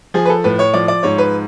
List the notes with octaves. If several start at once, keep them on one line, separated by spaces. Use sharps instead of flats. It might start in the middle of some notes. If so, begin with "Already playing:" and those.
F3 G#4
B4
A4
A2 B4
C#5
F3 D5
D5
G#2 C#5
B4